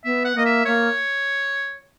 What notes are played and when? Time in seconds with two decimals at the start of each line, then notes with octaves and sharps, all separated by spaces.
0.04 B3 E5
0.25 F#5
0.35 A#3 D#5
0.45 E5
0.66 A#3 C#5